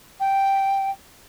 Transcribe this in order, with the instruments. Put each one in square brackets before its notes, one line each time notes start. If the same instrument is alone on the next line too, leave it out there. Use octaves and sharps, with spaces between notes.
[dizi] G5